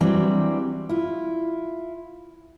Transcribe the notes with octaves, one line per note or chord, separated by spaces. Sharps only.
E3 F#3 G3 C4 D4
E4 F4